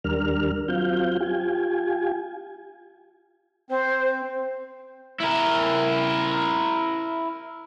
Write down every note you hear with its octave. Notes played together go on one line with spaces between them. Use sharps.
D#2 G3 D4 A#4 F6
F#3 C4 F4 F5 G6
F4 G4 G#5
C4 C5
E4 A#4